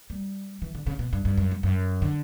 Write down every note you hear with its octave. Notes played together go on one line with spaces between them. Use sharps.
G3
E3
D3
C#3
B2
G2
G2
F#2
G2
F#2
D3